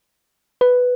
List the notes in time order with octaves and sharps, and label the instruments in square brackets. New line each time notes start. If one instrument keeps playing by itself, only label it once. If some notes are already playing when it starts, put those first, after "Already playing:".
[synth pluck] B4